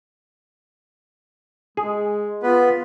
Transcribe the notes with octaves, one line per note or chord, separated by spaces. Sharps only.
G#3 G#4
B3 F4 B4